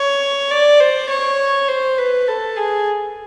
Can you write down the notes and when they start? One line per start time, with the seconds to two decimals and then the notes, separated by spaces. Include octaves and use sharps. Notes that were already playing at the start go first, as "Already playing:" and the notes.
Already playing: C#5
0.51 D5
0.80 C5
1.10 C#5
1.68 C5
1.98 B4
2.28 A4
2.56 G#4